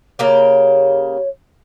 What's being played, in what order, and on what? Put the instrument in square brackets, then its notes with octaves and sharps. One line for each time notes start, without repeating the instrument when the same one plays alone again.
[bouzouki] C#3 A#3 G4 [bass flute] C#5